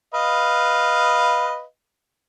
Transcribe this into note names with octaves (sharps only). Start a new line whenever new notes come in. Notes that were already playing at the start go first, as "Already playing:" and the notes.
B4 D#5 F5